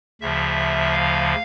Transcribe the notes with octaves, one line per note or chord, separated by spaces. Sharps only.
D2 C#3 F3 E5
F5